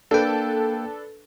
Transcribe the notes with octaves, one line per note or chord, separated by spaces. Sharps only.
A#3 D4 A4 B4 G5